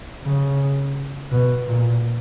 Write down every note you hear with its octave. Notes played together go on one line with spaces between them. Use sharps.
C#3
B2
A#2